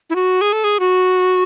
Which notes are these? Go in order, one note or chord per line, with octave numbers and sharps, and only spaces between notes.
E4
F#4
G#4
A4
G#4
F#4